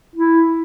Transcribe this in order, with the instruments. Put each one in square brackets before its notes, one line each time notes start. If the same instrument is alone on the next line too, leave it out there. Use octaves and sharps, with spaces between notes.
[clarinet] E4